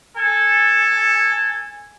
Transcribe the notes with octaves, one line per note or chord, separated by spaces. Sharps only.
A4 G#5